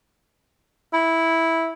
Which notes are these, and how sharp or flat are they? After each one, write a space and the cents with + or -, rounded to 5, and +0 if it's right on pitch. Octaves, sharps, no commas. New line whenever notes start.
E4 -10